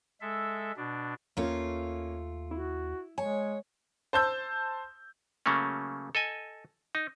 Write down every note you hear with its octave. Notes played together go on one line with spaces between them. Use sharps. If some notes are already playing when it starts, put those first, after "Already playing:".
G#3 A4 E5
B2 D4
D#2 A3 A#3 C#4 F4 C#5
E4 F#4
G#3 C#5 G#5
C5 A5 E6 G6
C#3 F#3 A3 A#3 C#4
A4 D#5 G#5
D#4